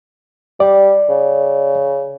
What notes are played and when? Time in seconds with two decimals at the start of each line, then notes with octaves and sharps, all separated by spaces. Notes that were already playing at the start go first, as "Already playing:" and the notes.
0.60 G3 D5
1.09 C#3